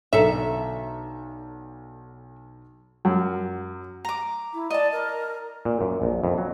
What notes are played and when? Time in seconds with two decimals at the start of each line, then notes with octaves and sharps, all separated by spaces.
0.13 B1 D3 A4 E5 A#5
3.05 F#2
4.05 A#5 D6
4.53 E4
4.70 D5 D#5 A5
4.92 A#4
5.65 A#2
5.81 F#2
6.02 A#1
6.24 F2
6.38 F#3